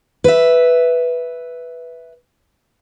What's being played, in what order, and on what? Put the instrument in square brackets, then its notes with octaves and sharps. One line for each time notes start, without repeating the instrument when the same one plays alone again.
[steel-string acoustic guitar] B4 E5